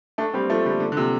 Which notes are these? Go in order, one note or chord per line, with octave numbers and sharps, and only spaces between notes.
A3 D4
G3 C4
F3 A3
D3 G3
D3
D3
C3 F3